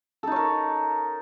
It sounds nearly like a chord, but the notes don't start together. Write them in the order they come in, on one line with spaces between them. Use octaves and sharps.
A4 D#4 C#5 A#4